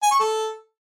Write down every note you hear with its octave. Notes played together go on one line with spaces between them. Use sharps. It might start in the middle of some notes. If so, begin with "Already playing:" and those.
G#5
C#6
A4